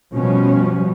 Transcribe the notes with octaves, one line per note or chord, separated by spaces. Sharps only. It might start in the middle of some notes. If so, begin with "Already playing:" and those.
B2 F3 G3 C#4